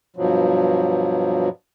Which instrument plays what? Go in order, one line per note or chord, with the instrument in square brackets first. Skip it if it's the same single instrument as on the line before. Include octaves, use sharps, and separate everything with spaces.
[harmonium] G2 B2 F3 F#3